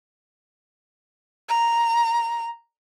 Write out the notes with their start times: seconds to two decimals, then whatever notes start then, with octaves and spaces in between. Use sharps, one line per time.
1.49 A#5